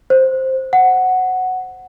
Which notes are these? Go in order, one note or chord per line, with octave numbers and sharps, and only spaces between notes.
C5
F#5